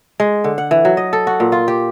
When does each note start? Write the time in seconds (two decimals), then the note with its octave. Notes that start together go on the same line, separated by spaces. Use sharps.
0.20 G#3
0.44 D3
0.58 F#5
0.71 E3
0.85 F#3
0.97 D#5
1.13 A4
1.27 F#4
1.40 A#2
1.52 F4
1.68 G4